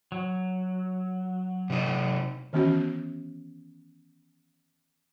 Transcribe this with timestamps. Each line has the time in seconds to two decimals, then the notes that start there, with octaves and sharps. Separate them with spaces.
0.12 F#3
1.70 C3 D#4
2.53 D#3 E3 B3 C#4 F#4